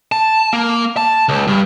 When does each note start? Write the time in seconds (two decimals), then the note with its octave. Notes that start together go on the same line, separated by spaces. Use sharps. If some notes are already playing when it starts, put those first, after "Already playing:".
0.12 A5
0.53 A#3
0.97 A5
1.29 C#2
1.48 G2